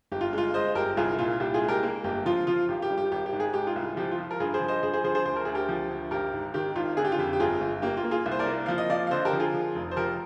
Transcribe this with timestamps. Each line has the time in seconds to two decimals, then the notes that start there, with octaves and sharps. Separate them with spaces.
0.12 G1 G4
0.21 F4
0.33 G#3 F4
0.54 G#3 C5 D#5
0.75 G1 G4 A#4
0.97 C2 F4 G#4
1.19 A#2 F4
1.40 C2 G4
1.54 F4 G#4
1.62 G#3
1.68 G4 A#4
1.83 A#3
2.04 G1 G4
2.26 F3 F4
2.47 F3 F4
2.68 G#1 G4
2.82 G4
2.91 G3
2.97 G4
3.12 G#1 G4
3.26 G4
3.33 G#2
3.40 G#4
3.53 G#3 G4
3.67 F4 G#4
3.76 C2
3.97 F3 G4
4.11 F4
4.18 F3
4.31 A#4
4.40 G2 F4 G#4
4.54 G#4 C5
4.61 F3
4.68 C5 D#5
4.83 G2 G#4 C5
4.93 G#4 C5
5.04 F3 G#4 C5
5.15 G#4 C5
5.26 D2 C5
5.36 A#4
5.45 D2 G#4
5.55 G4 A#4
5.69 F3
5.90 D2
6.11 G#1 G4 A#4
6.33 G#2
6.54 D#3 G4
6.75 G#1 F4
6.97 D3 G#4
7.05 G4
7.12 F4
7.18 F2 G4
7.33 G4
7.40 G1 F4 G#4
7.61 G1
7.82 A#3 G4
7.97 F4
8.04 A#3
8.11 F4 G#4
8.26 C2
8.32 C5
8.39 A#4 D5
8.47 A#3
8.66 F3 F5
8.78 D#5
8.90 F3 D5 F5
9.07 F5
9.11 D3 C5 D#5
9.25 G4 A#4
9.33 F3
9.40 F4 G#4
9.54 F3
9.75 F1
9.91 C5
9.96 F3 G4 A#4